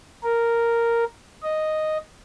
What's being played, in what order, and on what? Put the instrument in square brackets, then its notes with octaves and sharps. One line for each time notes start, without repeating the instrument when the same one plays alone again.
[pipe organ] A#4
D#5